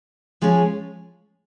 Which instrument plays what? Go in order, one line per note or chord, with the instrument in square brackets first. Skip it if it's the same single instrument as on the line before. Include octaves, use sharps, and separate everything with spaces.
[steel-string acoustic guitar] F3 G#3 C#4